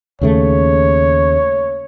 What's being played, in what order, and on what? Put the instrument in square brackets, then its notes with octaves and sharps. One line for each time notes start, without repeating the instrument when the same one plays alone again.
[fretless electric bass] D#2 C#3 A3 [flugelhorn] C#5